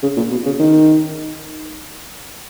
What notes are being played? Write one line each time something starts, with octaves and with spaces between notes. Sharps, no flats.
C#3
A#2
B2
C#3
D#3